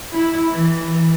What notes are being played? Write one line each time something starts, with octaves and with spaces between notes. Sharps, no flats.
E4
E3